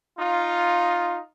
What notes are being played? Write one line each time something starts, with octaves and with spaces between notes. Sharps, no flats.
D#4 F4